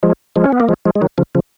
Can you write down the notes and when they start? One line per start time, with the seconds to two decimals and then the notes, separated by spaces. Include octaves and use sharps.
0.03 F3 G#3
0.36 F3 G#3
0.44 C#4
0.52 B3
0.60 A#3
0.69 F3 G#3
0.85 F3 G#3
0.95 G#3
1.01 D#3 F#3
1.18 C#3 F3
1.35 C#3 F3